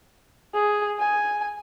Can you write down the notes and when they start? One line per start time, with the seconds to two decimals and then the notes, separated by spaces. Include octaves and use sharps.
0.54 G#4
0.99 G#5